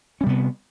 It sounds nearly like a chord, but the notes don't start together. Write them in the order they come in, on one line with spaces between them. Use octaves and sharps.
C#4 G3 C3 B3